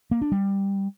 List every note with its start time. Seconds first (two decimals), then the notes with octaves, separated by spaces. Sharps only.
0.11 A#3
0.22 D4
0.32 G3